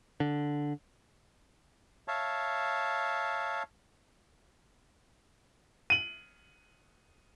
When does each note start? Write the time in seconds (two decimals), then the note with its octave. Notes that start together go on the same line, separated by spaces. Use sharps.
0.20 D3
2.08 C#5 E5 F5 A5
5.90 D#7 F#7